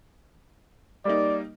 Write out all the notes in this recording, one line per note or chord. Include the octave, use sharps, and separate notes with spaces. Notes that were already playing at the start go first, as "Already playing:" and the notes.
G3 A#3 D#4 D5